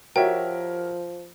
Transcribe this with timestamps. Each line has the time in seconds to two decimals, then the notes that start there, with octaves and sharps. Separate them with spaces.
0.16 F3 F#4 G4 A#4 C#5 E5 G5